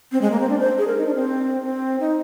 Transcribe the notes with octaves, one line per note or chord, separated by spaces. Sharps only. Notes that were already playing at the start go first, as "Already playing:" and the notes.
C4
G#3
A#3
C4
D4
C5
G#4
A#4
D#4
D4
C4
C4
D#4